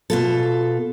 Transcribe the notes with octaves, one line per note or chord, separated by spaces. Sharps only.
B2 F4 A4